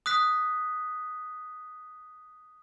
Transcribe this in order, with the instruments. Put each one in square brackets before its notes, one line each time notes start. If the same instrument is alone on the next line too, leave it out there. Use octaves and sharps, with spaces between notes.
[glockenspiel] D#6 F#6 B6